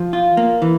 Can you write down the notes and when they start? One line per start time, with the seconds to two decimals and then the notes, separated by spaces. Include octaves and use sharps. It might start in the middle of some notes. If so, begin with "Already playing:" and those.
Already playing: F3
0.13 F4
0.37 A#3
0.62 E3